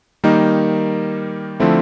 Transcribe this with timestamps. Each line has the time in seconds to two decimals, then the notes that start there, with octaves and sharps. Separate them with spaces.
0.24 D#3 G3 A#3 D#4
1.60 D3 F3 A3 C4 E4